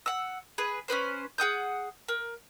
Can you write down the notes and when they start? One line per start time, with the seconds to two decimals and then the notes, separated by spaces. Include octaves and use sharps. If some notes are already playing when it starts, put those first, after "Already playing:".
0.06 F#5 E6
0.58 G#4 B4
0.88 C#4 E4 B4 C5
1.38 G#4 F#5 D#6 G6
2.08 A#4